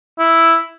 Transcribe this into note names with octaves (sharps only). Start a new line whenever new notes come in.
E4